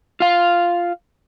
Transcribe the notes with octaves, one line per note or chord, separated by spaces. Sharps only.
F4 F5